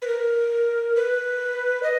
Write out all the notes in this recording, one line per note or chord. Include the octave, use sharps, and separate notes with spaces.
B4
A#4
B4
D#5